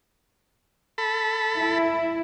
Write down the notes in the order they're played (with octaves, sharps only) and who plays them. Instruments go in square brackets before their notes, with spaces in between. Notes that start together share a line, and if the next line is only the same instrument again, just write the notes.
[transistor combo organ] A4 B5
[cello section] E4